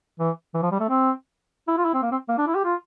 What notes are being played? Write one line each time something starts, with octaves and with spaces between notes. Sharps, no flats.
E3
E3
F3
G3
A3
C4
E4
F4
E4
C4
A#3
C4
A#3
D4
E4
G4
F4